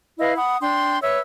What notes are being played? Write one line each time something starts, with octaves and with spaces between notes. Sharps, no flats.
E4 B4 D#5 F5
F#5 B5 D#6
D4 G5 C6
B4 C#5 E5 E6